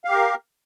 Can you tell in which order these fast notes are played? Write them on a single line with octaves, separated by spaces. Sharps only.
F5 G4 A#4